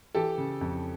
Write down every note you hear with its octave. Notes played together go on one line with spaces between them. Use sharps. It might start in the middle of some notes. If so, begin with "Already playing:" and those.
E3 G4 A4
C#3
F2